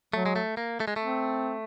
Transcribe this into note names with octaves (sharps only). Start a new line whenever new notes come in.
F#3 A3
G#3
A3
A#3
A3
G#3
A3
C4